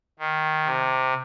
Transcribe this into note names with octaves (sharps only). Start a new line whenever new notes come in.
D#3
C3